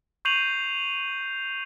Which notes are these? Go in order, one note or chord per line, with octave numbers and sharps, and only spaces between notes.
C#6 G6 C7 D#7 F7 F#7